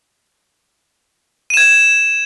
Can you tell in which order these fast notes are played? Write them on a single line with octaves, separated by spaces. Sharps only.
D#7 E7 G#6